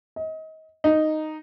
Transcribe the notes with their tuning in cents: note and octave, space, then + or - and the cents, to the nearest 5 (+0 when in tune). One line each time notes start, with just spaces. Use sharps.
D#5 +30
D#4 -5